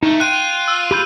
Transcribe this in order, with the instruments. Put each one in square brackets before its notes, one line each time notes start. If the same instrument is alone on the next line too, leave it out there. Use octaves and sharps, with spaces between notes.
[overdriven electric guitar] C#2 A3 [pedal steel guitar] D#4
[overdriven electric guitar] F4 [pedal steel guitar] G5 [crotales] F#6 D#7
[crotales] E6
[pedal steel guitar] G4 B5 G6